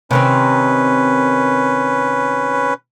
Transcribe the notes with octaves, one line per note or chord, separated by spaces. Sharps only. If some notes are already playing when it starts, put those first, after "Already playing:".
C3 D#3 C4 C#4 B4